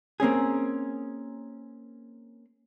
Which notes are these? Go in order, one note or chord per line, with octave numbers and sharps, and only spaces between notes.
A#3 C4 C#4 G#4